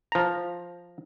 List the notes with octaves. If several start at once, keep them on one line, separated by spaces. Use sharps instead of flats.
F3 A#5